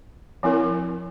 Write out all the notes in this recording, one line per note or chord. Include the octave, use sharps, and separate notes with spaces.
F3 C4 E4 A#4